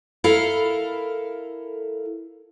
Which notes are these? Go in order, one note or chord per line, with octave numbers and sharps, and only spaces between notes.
E4 A4 A#4 F5